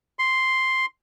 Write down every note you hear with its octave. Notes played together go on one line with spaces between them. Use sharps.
C6